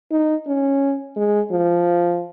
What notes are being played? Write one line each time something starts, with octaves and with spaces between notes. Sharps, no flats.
D#4
C#4
G#3
F3